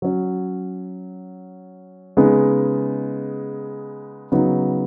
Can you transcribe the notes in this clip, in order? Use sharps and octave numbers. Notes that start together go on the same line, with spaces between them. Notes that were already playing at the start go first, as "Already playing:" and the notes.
F#3 C#4
C#3 G#3 B3 D#4
C#3 F#3 B3 D#4